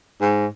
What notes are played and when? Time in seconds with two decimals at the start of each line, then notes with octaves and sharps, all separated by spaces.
0.21 G#2